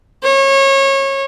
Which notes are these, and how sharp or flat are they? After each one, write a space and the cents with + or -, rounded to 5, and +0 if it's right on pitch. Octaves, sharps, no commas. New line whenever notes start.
C#5 -25